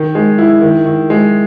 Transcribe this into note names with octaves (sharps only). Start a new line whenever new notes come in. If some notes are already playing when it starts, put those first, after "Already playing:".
Already playing: D#3
G#3
E4
D#3
D#3
G#3